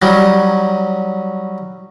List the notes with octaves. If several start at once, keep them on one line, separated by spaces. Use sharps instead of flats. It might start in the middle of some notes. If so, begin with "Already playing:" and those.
F#3 G3 C#4 D#4